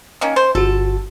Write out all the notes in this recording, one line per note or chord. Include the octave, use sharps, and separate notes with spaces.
D#3 A#3 C#4
C5
G1 F#4 A4